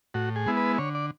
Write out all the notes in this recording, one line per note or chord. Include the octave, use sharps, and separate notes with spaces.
A2 F#4
G#4
G#3 B3 E4
B4
D3 C#5
D5